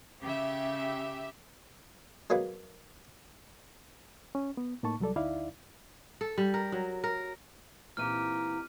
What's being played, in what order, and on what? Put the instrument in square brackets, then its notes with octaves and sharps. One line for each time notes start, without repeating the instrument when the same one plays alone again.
[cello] C#3 [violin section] G4 E5
[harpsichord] F#3 G#3 A#3 B3
[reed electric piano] C#4
B3
A2 A#3 D#4 A5 C#6
C2 F#3 G3 A4 D5
D2 D#4 E4 D5 E5 F5
[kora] A4
G3
A#4
F#3
A#4
[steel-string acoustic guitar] A#2 E3 D#4 [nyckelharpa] C4 G4 [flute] A#5 [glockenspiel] F6 D#7